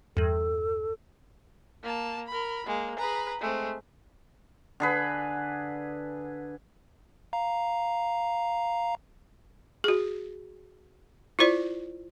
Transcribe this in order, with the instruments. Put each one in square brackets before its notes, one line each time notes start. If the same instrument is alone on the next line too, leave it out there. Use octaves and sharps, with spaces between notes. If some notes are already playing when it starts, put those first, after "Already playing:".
[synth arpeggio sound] E2 G2 [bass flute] A4
[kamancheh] A#3 A5
A#4 B5
[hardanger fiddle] G#3 [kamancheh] A#3
[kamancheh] G#4 B4 [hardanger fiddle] A#5 B5
[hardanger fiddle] G#3 C4 [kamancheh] A3
[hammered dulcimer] D3 G#4 B4
[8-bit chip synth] F5 A#5
[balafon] F#4 G#4
E4 F4 C5 D5